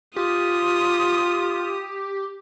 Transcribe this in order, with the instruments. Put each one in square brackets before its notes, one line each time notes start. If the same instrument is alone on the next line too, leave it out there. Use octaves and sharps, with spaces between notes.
[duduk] F4 [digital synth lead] G4 [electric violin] D#6